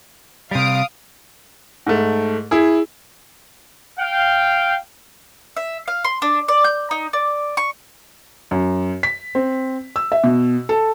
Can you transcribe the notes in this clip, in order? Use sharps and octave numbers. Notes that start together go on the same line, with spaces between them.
C3 G3 F5 D#6 D7
G#2 A3
E4 G#4
F5 G5
E5
F5
C6
D4
D5
G6
D#4
D5
C#6
F#2
B6
C4
E6
E5
B2
A4